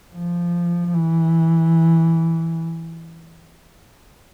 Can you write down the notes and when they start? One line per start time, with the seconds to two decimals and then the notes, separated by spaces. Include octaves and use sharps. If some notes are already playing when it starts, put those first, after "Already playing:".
0.14 F3
0.94 E3